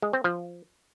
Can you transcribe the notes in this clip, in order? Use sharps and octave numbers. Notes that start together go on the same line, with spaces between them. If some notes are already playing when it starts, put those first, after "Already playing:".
G#3
C4
F3